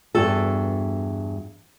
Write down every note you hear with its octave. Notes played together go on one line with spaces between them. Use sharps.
E2 G2 F#4 A4